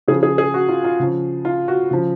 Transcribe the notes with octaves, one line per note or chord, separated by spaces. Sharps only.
C#3 F3 G#4
G#4
G#4
F#4
F4
F4
C#3 F3
F4
F#4
C#3 F3